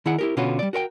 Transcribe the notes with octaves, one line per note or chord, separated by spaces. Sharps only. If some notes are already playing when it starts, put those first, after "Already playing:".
D#3 E4 G#4 F#5
E4 G4 A#4
B2 D3 C#4 F4 F#4 B4
G3 D5
F#4 A#4 C5 G5